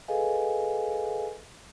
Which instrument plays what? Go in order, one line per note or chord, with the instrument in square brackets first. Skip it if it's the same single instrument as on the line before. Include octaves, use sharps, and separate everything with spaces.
[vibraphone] G#4 A4 B4 D#5 F5 G#5